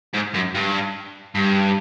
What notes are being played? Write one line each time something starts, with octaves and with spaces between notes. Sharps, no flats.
G#2
F#2
G2
G2